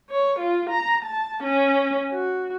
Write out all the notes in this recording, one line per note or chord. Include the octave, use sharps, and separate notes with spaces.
C#5
F4
A#5
A5
C#4
F#4